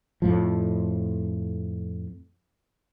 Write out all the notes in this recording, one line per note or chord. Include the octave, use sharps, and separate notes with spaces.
F2 A2 F3